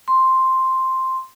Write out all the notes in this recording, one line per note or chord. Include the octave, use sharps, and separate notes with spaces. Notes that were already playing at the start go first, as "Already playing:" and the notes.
C6